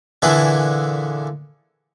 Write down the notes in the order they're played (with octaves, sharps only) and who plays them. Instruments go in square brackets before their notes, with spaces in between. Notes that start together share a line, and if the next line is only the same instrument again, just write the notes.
[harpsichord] A#2 D3 E3 D4 E4 G#4